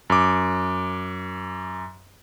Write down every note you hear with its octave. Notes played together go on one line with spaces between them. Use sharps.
F#2 D6